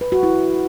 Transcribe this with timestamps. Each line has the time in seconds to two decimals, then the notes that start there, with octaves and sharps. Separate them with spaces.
0.01 B4
0.12 F#4
0.23 E4